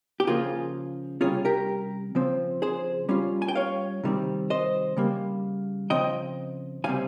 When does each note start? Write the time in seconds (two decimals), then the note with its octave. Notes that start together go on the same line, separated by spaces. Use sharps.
0.20 G4
0.27 C#3 F3 A#3 F4 G#4
1.21 C3 G3 C#4 F4 G#4
1.45 G4 A#4
2.15 C#3 F3 C4
2.62 G#4 C5
3.09 G3 C#4 F4
3.42 G#5
3.48 G5
3.55 C#5 F5
4.03 C3 D#3 G3 C4
4.50 C5 D#5
4.97 C#3 G3 A#3
5.90 C#3 F3 C4 D#5 G5
6.84 C3 G3 C4 F5 G#5